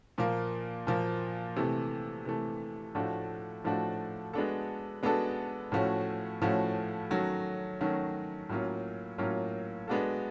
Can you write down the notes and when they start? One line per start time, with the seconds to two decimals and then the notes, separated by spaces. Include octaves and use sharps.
0.18 A#2 F3 A#3
0.87 A#2 F3 A#3
1.56 C3 E3 A3
2.25 C3 E3 A3
2.95 A2 F3 A3 D4 F#4
3.64 A2 F3 A3 D4 F#4
4.34 G#3 B3 D4 F#4 A4
5.03 G#3 B3 D4 F#4 A4
5.72 A2 F3 A3 C#4 F#4
6.41 A2 F3 A3 C#4 F#4
7.11 D#3 F#3 A3 C#4 F#4
7.81 D#3 F#3 A3 C#4 F#4
8.49 A2 F#3 A#3 C#4 F4
9.18 A2 F#3 A#3 C#4 F4
9.88 G#3 B3 D4 F#4 A4